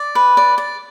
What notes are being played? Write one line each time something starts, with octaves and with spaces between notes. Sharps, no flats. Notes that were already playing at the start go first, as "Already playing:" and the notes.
Already playing: D5
B4
D5
D5